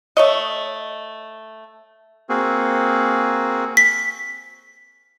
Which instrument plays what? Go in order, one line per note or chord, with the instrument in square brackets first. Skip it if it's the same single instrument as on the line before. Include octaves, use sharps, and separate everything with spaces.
[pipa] A3 C#5 D#5
[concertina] A#3 C4 F#4 G#4
[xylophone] B6